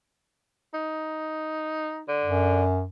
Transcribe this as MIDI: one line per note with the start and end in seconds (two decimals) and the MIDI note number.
0.74 2.02 63
2.09 2.64 50
2.24 2.87 42